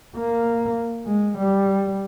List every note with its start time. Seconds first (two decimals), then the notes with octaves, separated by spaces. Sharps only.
0.17 A#3
1.07 G#3
1.38 G3